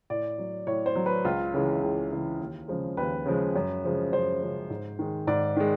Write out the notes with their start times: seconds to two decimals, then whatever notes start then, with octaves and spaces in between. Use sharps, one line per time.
0.10 A2 D5
0.38 F#3
0.67 A2 C#5
0.86 C5
0.95 F#3
1.06 B4
1.25 C#2 F4
1.54 C#3 E3 G#3
1.83 C#2
2.11 C#3 E3 G#3
2.40 D#2
2.68 C#3 F3 G#3
2.97 D#2 B4
3.26 C#3 F3 G#3
3.56 F#2
3.84 C#3 F3 G#3
4.12 F#2 C5
4.42 C#3 F3 G#3
4.70 G#2
4.99 D#3 G#3
5.27 G#2 D5
5.56 D#3 G#3